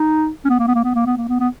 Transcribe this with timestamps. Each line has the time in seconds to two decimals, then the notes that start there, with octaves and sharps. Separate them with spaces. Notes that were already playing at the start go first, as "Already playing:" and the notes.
Already playing: D#4
0.45 C#4
0.49 B3
0.59 A#3
0.68 B3
0.75 A#3
0.84 B3
0.95 A#3
1.06 B3
1.17 A#3
1.29 B3
1.40 B3